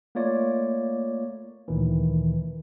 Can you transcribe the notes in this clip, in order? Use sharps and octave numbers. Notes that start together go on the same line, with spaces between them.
A3 A#3 F4 C#5 D5
D2 A#2 D#3 E3